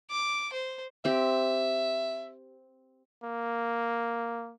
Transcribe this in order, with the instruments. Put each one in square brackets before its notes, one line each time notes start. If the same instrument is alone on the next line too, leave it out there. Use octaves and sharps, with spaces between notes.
[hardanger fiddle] D6
C5
[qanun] C4 G4 [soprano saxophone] E5
[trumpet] A#3